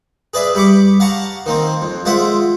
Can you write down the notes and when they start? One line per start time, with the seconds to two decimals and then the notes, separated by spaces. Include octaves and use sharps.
0.34 G#4 B4 D5 E5
0.55 G3 B5 C#6 D6
1.00 F5 F#5 A5 A#5 C#6
1.46 D#3 A#3 C4
1.82 F2
2.05 G#3 F4 C5 E5 F#5